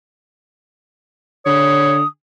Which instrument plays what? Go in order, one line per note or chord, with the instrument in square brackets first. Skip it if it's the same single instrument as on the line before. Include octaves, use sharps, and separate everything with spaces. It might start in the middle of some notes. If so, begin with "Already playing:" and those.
[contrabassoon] D3 [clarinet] C#5 [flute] D#6